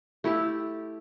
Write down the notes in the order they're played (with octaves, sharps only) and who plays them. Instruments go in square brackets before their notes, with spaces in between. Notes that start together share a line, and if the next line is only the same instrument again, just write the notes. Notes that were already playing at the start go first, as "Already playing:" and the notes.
[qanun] A3 E4 G4 A5